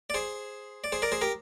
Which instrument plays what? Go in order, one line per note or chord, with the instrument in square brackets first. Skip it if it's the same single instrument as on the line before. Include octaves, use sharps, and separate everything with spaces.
[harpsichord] D5
G#4 C5
D5
G#4 C5
A#4 D5
G#4 C5
G4 A#4